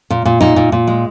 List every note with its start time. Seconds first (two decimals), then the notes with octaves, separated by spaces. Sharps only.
0.10 A#2
0.25 A#2
0.41 A#2 D#4
0.56 A#2
0.72 A#2
0.87 G#3